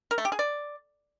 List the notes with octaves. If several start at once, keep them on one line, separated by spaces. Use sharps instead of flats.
A#4
A3
G4
G#4
D5